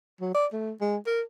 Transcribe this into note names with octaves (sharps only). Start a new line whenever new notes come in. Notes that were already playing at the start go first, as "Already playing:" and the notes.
F#3
D5
A3
G#3
A#4